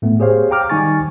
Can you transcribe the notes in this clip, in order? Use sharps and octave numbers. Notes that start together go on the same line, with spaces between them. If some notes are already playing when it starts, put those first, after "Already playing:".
A2 A3 B3
G4 G#4 C5 C#5 F5
G5 A#5 D6 F6
D#3 G3 D#4 G#5 C#6 A6